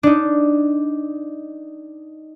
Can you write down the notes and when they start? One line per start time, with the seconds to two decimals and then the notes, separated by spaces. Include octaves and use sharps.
0.03 D4 D#4